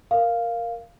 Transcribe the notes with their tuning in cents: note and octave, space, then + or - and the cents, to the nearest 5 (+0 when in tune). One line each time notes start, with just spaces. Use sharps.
A#4 +0 F5 +0